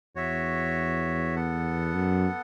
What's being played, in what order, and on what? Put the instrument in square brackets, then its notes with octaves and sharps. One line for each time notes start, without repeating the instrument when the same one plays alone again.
[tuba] E2 [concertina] F#4 C#5 E5
[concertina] B3 A4 F#5
[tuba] F#2